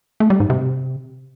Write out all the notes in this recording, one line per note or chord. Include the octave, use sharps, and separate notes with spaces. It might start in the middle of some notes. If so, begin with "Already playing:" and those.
A3
G3
G#2
C3